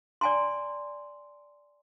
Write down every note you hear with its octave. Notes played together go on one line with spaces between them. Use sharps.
D5 G5 G#5 A#5 C6